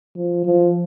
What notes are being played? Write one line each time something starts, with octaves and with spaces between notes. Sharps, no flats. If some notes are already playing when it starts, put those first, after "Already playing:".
F3
F3